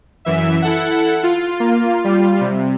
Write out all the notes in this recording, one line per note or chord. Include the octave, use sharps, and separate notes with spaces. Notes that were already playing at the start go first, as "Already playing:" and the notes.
F#2 E3 E5
E4 A4 F#5
F4
A#3
G3
C3